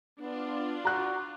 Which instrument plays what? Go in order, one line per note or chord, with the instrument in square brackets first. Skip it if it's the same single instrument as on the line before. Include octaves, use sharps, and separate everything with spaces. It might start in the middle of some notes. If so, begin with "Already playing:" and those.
[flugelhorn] B3 [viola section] D4 F4
[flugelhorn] F#4 [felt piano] A#5 F#6